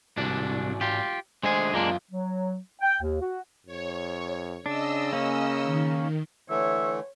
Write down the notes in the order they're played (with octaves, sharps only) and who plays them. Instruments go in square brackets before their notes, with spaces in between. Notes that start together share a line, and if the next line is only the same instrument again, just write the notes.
[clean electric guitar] C2 D4 [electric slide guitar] G#2 F#4 D5
[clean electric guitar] F4 G4
[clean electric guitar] G#3 G#4 [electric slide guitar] A3 D4 C5
[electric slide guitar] F#2 F4 [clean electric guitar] G#3 A#3 D4
[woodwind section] F#3
G5
D#2
F#4
[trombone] F2 [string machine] C#5
[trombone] C#3 [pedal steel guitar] D4 [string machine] D#5 E6
[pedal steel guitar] A#3 C#4
[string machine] D#3
[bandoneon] D3 E3 A3 [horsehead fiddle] C#5 [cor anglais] E5